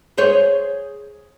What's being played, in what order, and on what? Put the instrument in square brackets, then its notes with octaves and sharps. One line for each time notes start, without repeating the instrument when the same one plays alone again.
[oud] G#4 C5 C#5